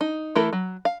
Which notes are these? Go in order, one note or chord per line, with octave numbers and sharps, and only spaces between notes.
D#4
E3 A3 E4 A4 A#4
F#3
F5